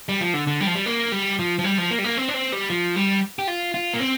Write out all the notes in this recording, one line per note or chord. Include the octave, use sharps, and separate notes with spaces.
G3
F3
D3
D3
G3
F3
G3
A#3
G3
F3
F3
G3
F3
A#3
G3
A#3
C4
D4
C4
G3
F3
G3
G4
F4
F4
A#3
C4